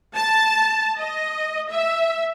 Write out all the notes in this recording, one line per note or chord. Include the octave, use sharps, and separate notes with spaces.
A5
D#5
E5